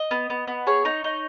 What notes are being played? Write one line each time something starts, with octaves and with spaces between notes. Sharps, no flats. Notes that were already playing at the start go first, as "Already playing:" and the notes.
Already playing: D#5
B3
B3
B3
G#4 C#5
D#4
D#4